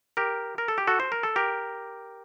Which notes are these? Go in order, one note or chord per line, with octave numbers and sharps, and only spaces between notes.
G4 A#4
A#4
A4
G4
F#4 A4
C5
A#4
A4
G4 A#4